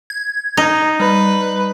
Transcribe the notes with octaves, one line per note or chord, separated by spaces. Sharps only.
G#6
D#4
G3 B4